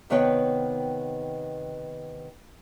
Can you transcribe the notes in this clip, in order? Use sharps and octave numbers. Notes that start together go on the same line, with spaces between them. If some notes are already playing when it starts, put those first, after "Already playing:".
C3 D#3 B3 B4 C#5 G5